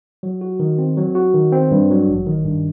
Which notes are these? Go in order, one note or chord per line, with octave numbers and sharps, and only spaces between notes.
F#3
F#4
D#3
C4
F#3
F#4
D#3
C4
G2
F#3
A1
D#3
G2